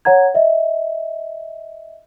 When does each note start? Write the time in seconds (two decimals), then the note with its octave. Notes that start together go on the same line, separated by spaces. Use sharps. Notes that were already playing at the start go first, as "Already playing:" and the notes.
0.05 C#5 F#5 A#5 G#6
0.34 D#5 E5